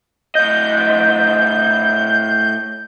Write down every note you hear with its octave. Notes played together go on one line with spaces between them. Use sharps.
A2 D#5 G6